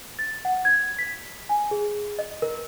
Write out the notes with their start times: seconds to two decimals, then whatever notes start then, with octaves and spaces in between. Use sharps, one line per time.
0.19 A6
0.45 F#5
0.65 G#6
0.99 B6
1.49 G#5
1.71 G#4
2.19 D#5
2.42 A#4